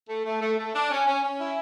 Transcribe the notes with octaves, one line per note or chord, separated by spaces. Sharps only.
A3
A3
A3
A3
D4
C#4
C#4
C#4
E4